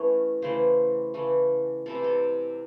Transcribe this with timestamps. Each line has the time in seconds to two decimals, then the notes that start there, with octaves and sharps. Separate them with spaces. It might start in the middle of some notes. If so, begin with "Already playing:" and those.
Already playing: E3 A3 C#4
0.42 C#3 E3 A3 C5
1.14 C#3 E3 A3
1.86 C3 E3 C4 A4
1.95 C5
2.04 A4